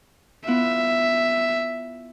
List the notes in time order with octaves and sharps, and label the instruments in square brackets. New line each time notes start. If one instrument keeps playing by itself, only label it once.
[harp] B3 E4 F4 [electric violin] E5